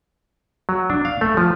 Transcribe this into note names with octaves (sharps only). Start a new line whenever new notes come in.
F#3
D4
F5
A3
F3